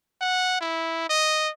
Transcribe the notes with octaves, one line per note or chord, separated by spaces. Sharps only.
F#5
E4
D#5